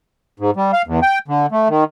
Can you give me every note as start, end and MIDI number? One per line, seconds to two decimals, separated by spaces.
0.40 0.51 44
0.57 0.71 55
0.73 0.82 77
0.87 1.00 40
1.03 1.19 79
1.28 1.46 50
1.52 1.68 57
1.69 1.84 51